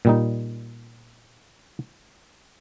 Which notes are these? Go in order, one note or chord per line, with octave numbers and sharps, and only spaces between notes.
A#2 G3 D#4